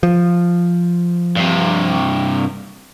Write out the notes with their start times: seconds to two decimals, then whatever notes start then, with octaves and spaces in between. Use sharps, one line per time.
0.03 F3
1.37 G2 C3